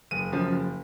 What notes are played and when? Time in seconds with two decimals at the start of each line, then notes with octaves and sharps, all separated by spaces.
0.11 F#1 D#7
0.32 F#2 C#3 F3
0.52 F#1